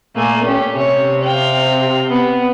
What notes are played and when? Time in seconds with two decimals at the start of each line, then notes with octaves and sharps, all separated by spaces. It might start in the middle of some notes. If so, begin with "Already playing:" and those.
0.16 A#2 A3 A#3 G#5
0.45 C#4 G4
0.76 C3 C#5
1.23 F5 G5
2.09 B3